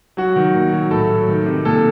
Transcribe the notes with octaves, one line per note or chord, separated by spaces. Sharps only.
F#3 F#4
D#3
A#2
F#3
A2 A4
F#3
D#3
C3
A#2 A4